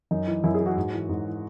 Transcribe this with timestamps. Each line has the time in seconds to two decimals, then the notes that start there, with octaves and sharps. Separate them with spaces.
0.11 F#2 D#4
0.28 E3
0.44 F#2 E4
0.54 G#4
0.60 E3
0.66 F#4
0.77 G#2
0.93 E3
1.09 G#2
1.25 E3